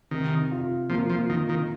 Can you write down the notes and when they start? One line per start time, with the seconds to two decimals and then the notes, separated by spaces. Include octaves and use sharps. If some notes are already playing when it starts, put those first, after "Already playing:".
0.11 C3 D#3
0.51 F4
0.89 F3 A#3
1.10 F3
1.29 D#3 F4
1.49 D#3